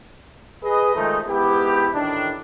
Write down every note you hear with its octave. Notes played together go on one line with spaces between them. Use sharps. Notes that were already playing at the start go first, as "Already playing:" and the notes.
G#4 B4 D#5
D#3 F3 G#3 A3 D#4
G#2 B3 E4 G4
A1 A2 D#3 D4